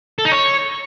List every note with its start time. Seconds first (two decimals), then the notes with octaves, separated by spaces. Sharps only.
0.18 A4
0.25 D#4
0.32 C#5